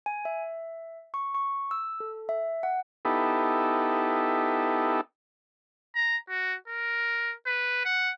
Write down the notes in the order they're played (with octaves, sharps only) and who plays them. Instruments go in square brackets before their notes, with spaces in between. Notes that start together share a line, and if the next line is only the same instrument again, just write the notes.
[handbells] G#5
E5
C#6
C#6
E6
A4
E5
F#5
[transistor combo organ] B3 D#4 E4 G4 A4
[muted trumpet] A#5
F#4
A#4
B4
F#5